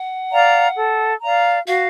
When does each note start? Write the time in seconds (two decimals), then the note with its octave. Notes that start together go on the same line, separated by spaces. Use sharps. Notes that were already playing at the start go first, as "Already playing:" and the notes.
Already playing: F#5
0.31 D5 F5 A#5
0.76 A4
1.22 D5 F5 A#5
1.67 F#4 F5